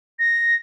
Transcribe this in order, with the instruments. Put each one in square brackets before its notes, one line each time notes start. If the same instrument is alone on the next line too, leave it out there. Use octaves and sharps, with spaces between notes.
[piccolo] A#6